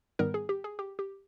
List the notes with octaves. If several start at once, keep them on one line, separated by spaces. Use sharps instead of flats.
G#2 D#3 G3 B3 D#4 A#4
G#4
G4
G#4
G4
G4